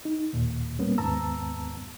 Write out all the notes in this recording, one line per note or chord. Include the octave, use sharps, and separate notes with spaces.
D#4
D#2 A#2
G3 A#3 B3 C#4
D#2 G#2 B3 A5 A#5 E6